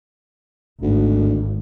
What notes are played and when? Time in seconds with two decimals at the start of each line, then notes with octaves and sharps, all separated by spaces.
0.82 G#1 D2